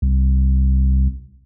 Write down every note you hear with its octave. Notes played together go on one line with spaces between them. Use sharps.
C2